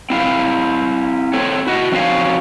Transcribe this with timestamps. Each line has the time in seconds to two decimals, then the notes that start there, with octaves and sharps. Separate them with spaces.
0.10 C4 E4 F5
1.33 C4 A4 C#5
1.67 E4 F#4 D#5
1.92 F3 C4 C#4 D#4 F#4 F5